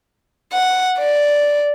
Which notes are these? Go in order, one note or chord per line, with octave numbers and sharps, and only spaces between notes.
F#5
D5